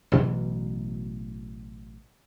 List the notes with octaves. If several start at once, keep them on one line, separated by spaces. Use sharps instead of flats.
A1 B2 E3 F#3